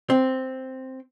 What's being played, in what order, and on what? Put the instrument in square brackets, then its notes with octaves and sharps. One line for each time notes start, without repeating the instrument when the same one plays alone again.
[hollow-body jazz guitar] C4